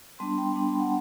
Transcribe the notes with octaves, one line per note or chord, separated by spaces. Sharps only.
G3 B3 D4 A5 C6
G5 B5
G3 B3 D4
G5 B5
F#5 A5